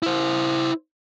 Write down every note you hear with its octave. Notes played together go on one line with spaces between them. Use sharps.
E4 C5